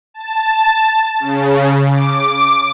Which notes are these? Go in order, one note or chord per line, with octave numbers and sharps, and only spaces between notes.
A5
C#3
D6